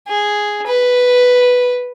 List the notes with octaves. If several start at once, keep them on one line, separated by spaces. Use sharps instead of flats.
G#4
B4